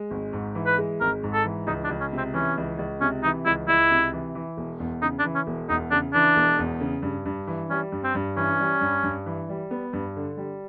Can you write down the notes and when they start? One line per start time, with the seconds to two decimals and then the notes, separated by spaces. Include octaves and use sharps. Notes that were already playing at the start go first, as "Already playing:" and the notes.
Already playing: G#3
0.11 G#1
0.33 G#2
0.55 E3
0.67 B4
0.78 G#3
1.01 G#1 A#4
1.23 G#2
1.34 A4
1.44 E3
1.67 C#2 D#4
1.84 D4
1.89 C#2
2.01 C#4
2.13 C3 C4
2.34 E3 C#4
2.57 C#2
2.78 C#2
3.01 C3 C#4
3.23 E3 D#4
3.46 C#2 E4
3.68 C#2 E4
3.91 C3
4.13 E3
4.35 E3
4.57 E1
4.80 E2
5.02 C#3 D#4
5.19 D4
5.24 E3
5.36 C#4
5.47 E1
5.69 E2 D#4
5.91 C#3 D4
6.14 E3 D4
6.36 E1
6.59 E2
6.80 C#3
7.03 G2
7.26 G2
7.47 E3
7.70 G3 C#4
7.92 G2
8.04 C4
8.15 G2
8.36 E3 C#4
8.60 G3
8.81 G2
9.03 G2
9.26 E3
9.49 G3
9.71 B3
9.93 G2
10.16 D3
10.37 G3